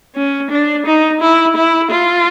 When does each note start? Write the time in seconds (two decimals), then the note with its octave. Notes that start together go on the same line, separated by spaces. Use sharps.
0.16 C#4
0.50 D4
0.86 D#4
1.21 E4
1.56 E4
1.91 F4